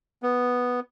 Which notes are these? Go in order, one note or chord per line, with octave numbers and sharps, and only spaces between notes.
B3